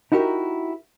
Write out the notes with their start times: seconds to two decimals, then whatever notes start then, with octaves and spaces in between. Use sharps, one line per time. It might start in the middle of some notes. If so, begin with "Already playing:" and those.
0.12 D#4 E4 F#4 G4 A#4